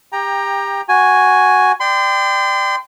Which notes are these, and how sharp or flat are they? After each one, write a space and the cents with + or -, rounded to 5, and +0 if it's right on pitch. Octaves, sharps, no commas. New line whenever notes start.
G4 +25 G5 +15 A#5 +10
F#4 +0 G#5 +0
D5 +20 G5 +0 C6 -35